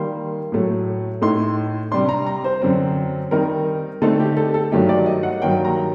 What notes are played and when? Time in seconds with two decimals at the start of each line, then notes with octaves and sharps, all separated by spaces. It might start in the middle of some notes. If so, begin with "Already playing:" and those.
Already playing: D#3 G3 A#3 C6
0.52 A2 F#3 A3
1.21 A2 A3 D#4 C6
1.92 C3 G3 D4 C6
2.09 A#5
2.27 A#5
2.44 C5
2.62 F#2 D3 F#3 C4
3.31 D#3 G3 C4 D#4 A#4
4.02 D3 A3 C4 D#4 A4
4.20 G4
4.37 A4
4.54 A4
4.72 G2 D#3 F#3 A3 D#4 G4
4.89 D5
5.06 D#5
5.23 F#5
5.41 G2 D#3 F#3 A#3 G5
5.65 A#5